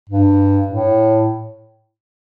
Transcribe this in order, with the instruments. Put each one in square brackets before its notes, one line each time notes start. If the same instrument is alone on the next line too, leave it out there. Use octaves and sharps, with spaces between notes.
[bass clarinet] G2
A2